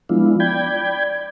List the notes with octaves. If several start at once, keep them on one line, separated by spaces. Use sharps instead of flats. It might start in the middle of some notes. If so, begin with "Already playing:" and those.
F3 G#3 B3 D4 E4 F4
D5 G5 B5 G6 G#6